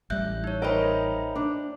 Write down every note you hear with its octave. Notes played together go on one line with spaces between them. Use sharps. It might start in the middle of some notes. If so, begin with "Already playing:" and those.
A1 G3 E5 F#6 G6
D#4 C#5
D#4 A#4 C5 C#5 D#5 E5 G5 B5
D4